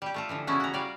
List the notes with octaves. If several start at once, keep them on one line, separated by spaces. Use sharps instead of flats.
G3 G4
A3 F4 A4
D3 E3 F3
C#3 E3 B3 C#4 E4 F#4
F#4 A#5
G3 D5 F5